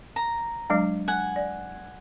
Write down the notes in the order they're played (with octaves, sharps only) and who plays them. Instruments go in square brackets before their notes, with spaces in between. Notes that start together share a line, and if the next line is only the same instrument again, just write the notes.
[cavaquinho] A#5
[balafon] F#3 G#3 D4
[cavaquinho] F#5 G#5
[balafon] D5